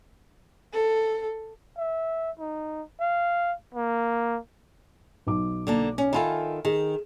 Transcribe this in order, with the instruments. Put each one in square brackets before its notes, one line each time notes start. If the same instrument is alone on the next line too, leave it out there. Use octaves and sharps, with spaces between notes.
[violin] A4
[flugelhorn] E5
D#4
F5
A#3
[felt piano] B1 D6
[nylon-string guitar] D3 A#3 A5
C#4
[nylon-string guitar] D#3 F4 A4 [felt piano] E5 G#5 B5
[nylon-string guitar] D#3 [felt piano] G#4